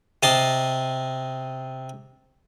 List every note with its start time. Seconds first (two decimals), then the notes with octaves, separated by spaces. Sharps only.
0.23 C3 D#5 A5 C6